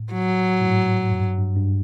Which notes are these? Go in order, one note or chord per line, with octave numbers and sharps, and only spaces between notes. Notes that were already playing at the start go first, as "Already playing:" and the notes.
Already playing: A2
F#3
A2
G#2
F#2
G2
G2
G2